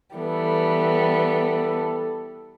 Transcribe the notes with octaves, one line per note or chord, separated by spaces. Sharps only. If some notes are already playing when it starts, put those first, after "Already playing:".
E3 G3 B3 A4